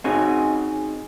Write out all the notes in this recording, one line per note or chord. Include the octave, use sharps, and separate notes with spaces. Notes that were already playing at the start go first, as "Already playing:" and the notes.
C4 C#4 D#4 F#4 G#4